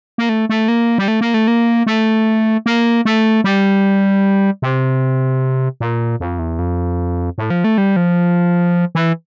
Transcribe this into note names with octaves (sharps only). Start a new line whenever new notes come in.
A#3
A3
A3
A#3
G3
A3
A#3
A3
A#3
A3
A#3
A3
G3
C3
A#2
F2
E2
F2
A2
F3
A3
G3
F3
E3